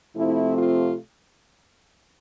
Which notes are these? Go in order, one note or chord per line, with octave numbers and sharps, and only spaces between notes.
C3 F3 A3 C4 E4
F4